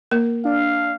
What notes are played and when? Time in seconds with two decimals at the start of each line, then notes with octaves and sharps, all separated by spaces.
0.11 A#3 A#4
0.45 D4 F5